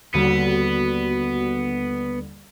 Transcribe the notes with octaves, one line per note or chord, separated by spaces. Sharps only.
D#2 D3 G3 B3 F#4